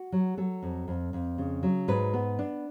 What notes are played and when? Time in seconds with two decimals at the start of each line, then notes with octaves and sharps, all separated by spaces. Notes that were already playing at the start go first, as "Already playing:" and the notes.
Already playing: F#4
0.12 F#3
0.37 F#3 A4
0.62 F2
0.88 F2
1.13 F2
1.38 C#3
1.63 F#3
1.88 G#2 B4
2.14 B3
2.39 D4